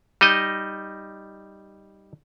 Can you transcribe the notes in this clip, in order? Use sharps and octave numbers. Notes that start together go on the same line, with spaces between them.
G3 D#4 D#5